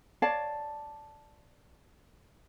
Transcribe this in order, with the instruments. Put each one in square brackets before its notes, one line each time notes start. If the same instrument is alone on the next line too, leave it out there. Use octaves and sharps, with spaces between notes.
[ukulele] C#5 D5 F5 A5